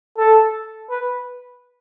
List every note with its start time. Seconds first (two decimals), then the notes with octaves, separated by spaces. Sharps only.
0.17 A4
0.90 B4